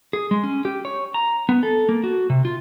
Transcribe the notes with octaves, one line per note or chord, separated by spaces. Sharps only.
G#4
G#3
C#4
G4
C#5
A#5
B3
A4
A#3
F#4
C3
F4